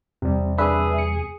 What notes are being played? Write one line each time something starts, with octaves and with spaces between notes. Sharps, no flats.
E2 C3 G3
D4 G#4 B4 E5
C#7